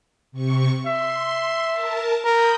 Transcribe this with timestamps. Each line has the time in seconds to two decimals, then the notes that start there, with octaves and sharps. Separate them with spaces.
0.32 C3 C#6
0.87 E5 C6
1.70 A#4 A5
2.25 A#4 B5 D#6 G6